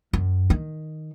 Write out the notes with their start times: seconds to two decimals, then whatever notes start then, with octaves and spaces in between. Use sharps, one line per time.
0.13 F#2
0.50 D#3